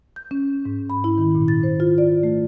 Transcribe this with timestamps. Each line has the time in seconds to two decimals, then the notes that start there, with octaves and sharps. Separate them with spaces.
0.16 G6
0.31 C#4
0.65 G#2
0.90 B5
1.04 E4
1.18 D#3
1.35 A#2
1.48 A6
1.63 C5
1.80 F4
1.98 D5
2.23 A3